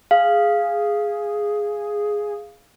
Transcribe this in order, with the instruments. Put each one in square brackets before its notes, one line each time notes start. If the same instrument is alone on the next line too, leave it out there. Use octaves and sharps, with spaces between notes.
[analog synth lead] G#4 [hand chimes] F5